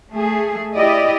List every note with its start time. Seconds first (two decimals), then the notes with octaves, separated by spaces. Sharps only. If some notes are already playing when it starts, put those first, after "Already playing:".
0.13 A3 G#4
0.76 E4 G4 D5 D#5